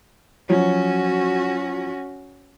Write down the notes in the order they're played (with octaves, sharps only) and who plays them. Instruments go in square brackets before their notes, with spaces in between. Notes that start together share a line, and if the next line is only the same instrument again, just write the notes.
[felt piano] F3 F#3 C#5 [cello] C#4 F#4